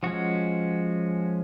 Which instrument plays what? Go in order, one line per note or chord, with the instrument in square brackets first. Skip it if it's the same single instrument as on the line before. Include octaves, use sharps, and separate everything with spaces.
[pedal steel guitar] F3 G#3 C#4 F#4